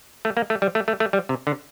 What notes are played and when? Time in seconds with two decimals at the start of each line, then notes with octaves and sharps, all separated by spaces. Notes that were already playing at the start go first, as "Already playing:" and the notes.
0.25 A3
0.37 A#3
0.50 A3
0.62 G3
0.75 A3
0.88 A3
1.00 A3
1.13 G3
1.29 C3
1.47 D3